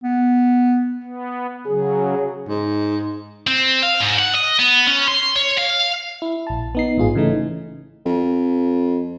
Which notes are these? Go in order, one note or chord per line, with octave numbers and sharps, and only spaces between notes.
B3
B3
C#3 F#3 G#4
G#2
C4
F5
G#2
F#5
D#5
B3
C#4
C6
C#5
F5
E4
A#1 A5
B3 D#4 C7
A1 G#2 F4 G#4
C#3 E3 A3 D#4
F2